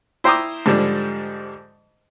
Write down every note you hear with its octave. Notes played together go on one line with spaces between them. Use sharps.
E4 C5 G5 A#5 D6 D#6
G#2 D3 F3 G3